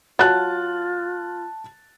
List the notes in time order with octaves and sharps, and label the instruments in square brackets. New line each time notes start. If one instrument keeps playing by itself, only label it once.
[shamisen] F#3 [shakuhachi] F4 [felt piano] A5 F#6 A6